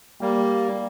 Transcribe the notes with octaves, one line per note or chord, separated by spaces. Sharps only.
G3 A#3